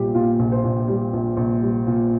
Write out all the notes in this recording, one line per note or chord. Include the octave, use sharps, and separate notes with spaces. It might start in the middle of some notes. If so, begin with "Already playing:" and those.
Already playing: A#1 A#2 G3 F4 G4
A#2 F4
A#1
C5
A#1
G3
A#1
A#1
G3
A#2